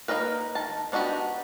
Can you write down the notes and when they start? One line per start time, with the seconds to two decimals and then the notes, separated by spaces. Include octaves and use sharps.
0.08 A#3 D4 D#4 A#4 B4
0.55 D#3 A5
0.92 B3 D4 D#4 F#4 G4